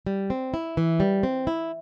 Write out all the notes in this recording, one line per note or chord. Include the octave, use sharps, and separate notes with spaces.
G3
C4
E4
E3
G3
C4
E4